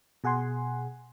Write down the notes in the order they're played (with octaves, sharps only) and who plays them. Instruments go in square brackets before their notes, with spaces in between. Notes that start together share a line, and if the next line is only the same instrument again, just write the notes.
[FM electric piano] B2 G#4 F#5 G#5 C6